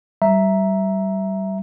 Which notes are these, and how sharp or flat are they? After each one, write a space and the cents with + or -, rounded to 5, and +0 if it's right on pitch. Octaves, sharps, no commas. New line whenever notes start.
G3 -25 E5 +0 A#5 +5